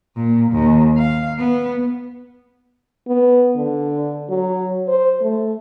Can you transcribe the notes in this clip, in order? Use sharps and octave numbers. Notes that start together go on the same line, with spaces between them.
A#2
D#2
F5
B3
B3
D3
F#3
C5
A3